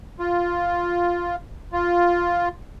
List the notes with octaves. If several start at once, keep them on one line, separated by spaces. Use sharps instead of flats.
F4
F4